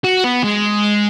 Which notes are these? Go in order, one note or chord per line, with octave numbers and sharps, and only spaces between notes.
F#4
B3
G#3